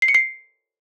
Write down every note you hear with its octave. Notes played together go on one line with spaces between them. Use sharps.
C7
C#7
C7